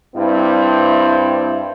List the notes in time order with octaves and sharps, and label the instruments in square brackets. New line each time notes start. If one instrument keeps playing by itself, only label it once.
[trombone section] G2 C4 E4